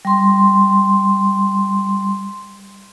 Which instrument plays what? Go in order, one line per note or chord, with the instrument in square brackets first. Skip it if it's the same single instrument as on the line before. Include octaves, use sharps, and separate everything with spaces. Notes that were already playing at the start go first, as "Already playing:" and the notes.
[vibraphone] G3 C6